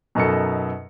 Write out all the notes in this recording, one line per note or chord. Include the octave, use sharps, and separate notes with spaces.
F#2 B2 D#4 A4 A#4 C#7